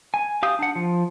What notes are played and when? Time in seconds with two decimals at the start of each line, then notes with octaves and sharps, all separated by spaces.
0.14 G#5
0.43 G4 F5 D#6 G6
0.59 D4 F#5
0.75 F3